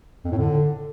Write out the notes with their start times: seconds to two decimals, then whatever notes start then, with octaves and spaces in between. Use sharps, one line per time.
0.25 F2
0.32 A2
0.38 D3